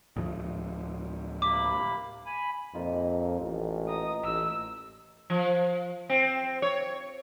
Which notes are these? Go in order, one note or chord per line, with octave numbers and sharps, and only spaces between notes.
D2 A2 F3
C3 A#3 B5 D6
G#5 B5
F2 A#2 D#4 F4
A1
D#5 A#5 D#6
A1 E6
F3
C4
C#5